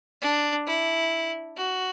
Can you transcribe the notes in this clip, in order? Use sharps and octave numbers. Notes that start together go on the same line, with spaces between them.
D4
E4
F#4